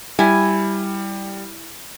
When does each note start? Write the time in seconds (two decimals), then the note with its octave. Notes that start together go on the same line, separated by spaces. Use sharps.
0.19 G3 E4 G#5